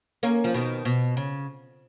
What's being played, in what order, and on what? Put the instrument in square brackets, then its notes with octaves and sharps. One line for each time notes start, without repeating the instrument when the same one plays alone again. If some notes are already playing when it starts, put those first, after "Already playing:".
[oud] A#3 C#4
F3
B2 D#3
B2
C#3